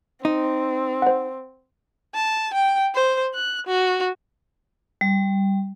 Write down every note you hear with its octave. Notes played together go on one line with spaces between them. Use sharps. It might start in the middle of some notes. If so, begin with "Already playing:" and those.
C4 D#4
C5 F#5
A5
G5
C5
F#6
F#4
G3